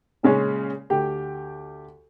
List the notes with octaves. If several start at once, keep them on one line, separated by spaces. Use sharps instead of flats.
A#2 C#3 G#3 C#4
D2 G4 G5